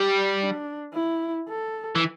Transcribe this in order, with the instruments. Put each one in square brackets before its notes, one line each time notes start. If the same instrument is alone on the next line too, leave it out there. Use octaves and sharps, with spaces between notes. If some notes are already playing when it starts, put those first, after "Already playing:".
Already playing: [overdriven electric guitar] G3
[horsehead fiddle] D4
E4
A4
[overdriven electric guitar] E3